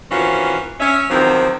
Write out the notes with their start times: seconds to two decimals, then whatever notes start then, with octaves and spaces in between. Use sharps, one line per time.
0.10 D#3 E3 C4 C#4 F4 F#4
0.80 C#4 E5
1.10 E2 D#3 F3 F#3 C4